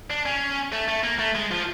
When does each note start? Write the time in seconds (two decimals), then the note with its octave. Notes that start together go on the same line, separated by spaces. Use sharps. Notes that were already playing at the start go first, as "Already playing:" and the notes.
0.10 D4
0.26 C#4
0.73 A3
0.88 A3
1.03 A#3
1.19 A3
1.36 G#3
1.51 F3